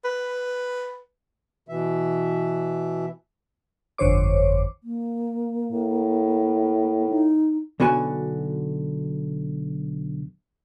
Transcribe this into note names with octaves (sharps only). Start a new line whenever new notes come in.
B4
B2 E3 E5
G1 F2 D3 C5 C#5 D6
A#3
A2
D#4
B1 D3 B3 F#4 G#5